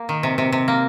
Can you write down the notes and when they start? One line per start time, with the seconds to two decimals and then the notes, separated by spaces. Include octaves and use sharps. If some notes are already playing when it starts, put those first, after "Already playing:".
Already playing: A#3
0.09 D#3
0.23 C3
0.38 C3
0.52 C3
0.68 A#3